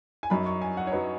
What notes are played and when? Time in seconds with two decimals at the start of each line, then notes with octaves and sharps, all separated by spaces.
0.23 G#5
0.30 F#2 F#3 D#4 B5
0.46 C#6
0.62 G#5
0.77 F#5
0.87 C#5
0.92 F#3 D#4 B4